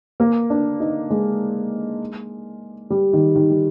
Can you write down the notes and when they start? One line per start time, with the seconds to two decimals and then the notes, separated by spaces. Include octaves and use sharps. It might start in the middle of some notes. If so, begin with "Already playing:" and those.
0.20 A#3
0.50 D4
0.80 D#4
1.10 G#3
2.90 G3
3.13 D#3
3.36 D#3
3.50 G3